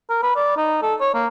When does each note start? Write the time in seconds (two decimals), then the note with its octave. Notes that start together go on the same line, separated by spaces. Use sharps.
0.10 A#4
0.23 B4
0.36 D5
0.57 D#4
0.82 A4
1.01 C#5
1.15 A#3